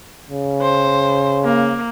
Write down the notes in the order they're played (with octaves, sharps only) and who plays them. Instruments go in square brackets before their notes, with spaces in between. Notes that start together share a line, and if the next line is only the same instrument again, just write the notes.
[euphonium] C#3
[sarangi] C5
A#3